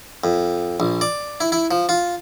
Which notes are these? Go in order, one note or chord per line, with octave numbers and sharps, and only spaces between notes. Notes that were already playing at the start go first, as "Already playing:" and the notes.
F2
A#1
D5
E4
E4
F3
F4